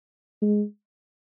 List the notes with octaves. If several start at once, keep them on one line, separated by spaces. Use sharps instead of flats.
G#3